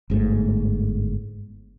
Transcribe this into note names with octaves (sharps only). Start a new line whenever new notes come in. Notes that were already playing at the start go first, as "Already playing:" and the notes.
G1 G#2 C3 A3